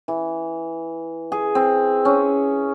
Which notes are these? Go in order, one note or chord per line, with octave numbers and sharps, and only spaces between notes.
E3
G#4
C4
C#4